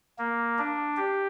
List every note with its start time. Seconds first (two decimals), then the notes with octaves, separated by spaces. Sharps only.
0.19 A#3
0.58 D4
0.97 G4